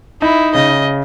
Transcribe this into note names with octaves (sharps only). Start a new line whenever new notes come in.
D#4 E4
C#3 D#5